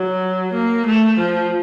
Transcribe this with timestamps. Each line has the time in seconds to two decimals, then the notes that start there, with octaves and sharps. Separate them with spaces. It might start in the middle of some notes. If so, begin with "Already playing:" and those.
Already playing: F#3
0.53 A#3
0.86 A3
1.18 F3